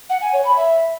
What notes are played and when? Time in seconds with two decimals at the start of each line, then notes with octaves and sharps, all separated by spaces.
0.10 F#5
0.21 G#5
0.33 C#5
0.45 B5
0.57 E5